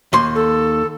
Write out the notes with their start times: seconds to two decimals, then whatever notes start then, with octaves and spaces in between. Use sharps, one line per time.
0.13 D#2 C6
0.35 A4